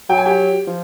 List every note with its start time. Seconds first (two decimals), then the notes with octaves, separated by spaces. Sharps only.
0.09 F#3 G5
0.18 G#5
0.26 G4 G5
0.67 F3